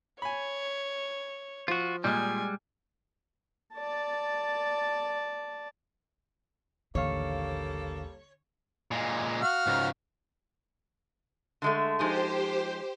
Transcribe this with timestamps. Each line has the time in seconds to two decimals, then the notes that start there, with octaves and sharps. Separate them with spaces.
0.22 C#5 G#5 B5
1.68 F3 F4 F#4
2.04 A#2 G3 G#3 D#5 G#5 F6
3.75 D5 A5
6.95 A1 D#2 D3 G3 A#3 A4 C#5 F5
8.91 A#2 G#3
9.42 F#4 F5 F6
9.67 C#2 G#2
11.62 D3 G#3 A3
11.99 F3 G#3 D#4 G4 C5